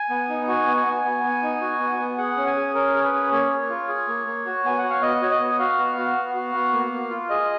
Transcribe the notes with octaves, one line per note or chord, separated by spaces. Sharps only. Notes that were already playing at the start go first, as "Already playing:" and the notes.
Already playing: G#5
B3
D#4
F#4 G#5
B3
G#5
B3
B3
B3
D#4
F#4
B3
B3
G#4 F#5
C#4
G#5
G#4
C#4 A#4
G#4 C#5
B4
C#4
A#3 C#5
A#3
F4
G#4
A#3
A#3
F#4
B3 G#5
F#4 F#5
F5
B3 D#5
F#4 C#5
D#5
B3
F#4 F5
B3
F#4
B3
F#4
B3
A#3
A#3
F4
G#4 D#5